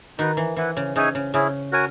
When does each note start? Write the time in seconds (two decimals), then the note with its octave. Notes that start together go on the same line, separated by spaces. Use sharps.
0.18 D#3 D#4 F#4 B4
0.37 E3
0.56 E3 E4 B4 F#5
0.77 C#3
0.96 C#3 D#4 G#4 C#5 E5 G#5
1.15 C#3
1.34 C#3 C#4 E4 G#4
1.72 F#4 A#4 C#5 G#5